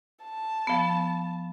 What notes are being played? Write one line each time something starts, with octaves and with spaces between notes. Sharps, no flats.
A5
F3 B3